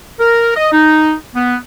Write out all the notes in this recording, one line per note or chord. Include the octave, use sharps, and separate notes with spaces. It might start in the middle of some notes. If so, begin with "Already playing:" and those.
A#4
D#5
D#4
B3